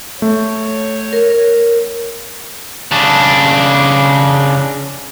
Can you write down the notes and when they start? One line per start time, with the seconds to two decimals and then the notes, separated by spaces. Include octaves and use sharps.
0.22 A3 C#5
1.13 A#4
2.91 C#3 D4